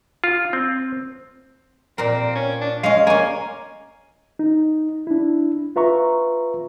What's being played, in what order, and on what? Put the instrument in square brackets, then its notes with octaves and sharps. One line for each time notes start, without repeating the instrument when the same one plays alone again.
[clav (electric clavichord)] F4
C4
[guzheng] A#2 A#4 [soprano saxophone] C4
[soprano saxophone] C#4
D4
[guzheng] G#3 C#4 [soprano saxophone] F5
[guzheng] A#3 C#4 [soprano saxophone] G#5
[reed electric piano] D#4
D4 E4
F4 B4 E5 A#5 C#6